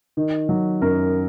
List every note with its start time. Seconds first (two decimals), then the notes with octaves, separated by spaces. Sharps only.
0.17 D#3
0.49 F#3
0.81 F#2 A#4